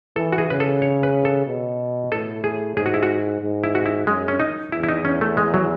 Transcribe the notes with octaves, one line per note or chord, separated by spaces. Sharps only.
E3 A4
F#4
G#4
C#3 B4
A4
C#5
B4
A4
B2
A2 A4
G#4
G#2 G#4
F#4
E4
F#4
G#2
E4
F#4
E4
F#2 G#3
C#4
D#4
E2 E4
E4
D#4
C#4
A3
G#3
F#3